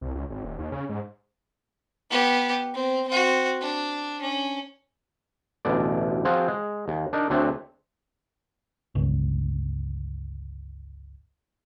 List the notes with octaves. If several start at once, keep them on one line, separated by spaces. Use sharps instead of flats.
C2
C#2
G#1
D#1
D#2
C#3
G#2
B3 G4
C4
C4 F#4
D4
C#4
A1 D2 B2 D5
F3 C4 F4 F#4 G#4
G#3
D#2
D4 D#4 A#4
D2 A3 C4 D4 C#5 E5
G1 C#2